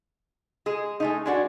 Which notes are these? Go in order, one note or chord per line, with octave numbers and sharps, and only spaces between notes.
G#3 G#4
G#3 A3 D#4
G#3 D4 F#4